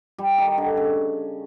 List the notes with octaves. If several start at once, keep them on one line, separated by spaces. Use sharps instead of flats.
G3
D#3
D3
C#3